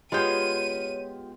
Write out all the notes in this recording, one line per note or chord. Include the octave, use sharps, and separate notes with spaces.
G#3 B3 F4 G4 G#4 C#5 D#7